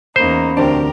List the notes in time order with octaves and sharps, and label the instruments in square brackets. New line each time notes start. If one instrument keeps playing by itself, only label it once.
[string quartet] E2 A#3 D#4 [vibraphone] C#4 A#5 B5 [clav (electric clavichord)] C5
[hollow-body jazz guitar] D2 C4 D4 [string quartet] G4 A#4 [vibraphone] G5